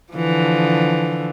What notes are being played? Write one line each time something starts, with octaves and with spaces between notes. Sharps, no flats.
D3 E3 F3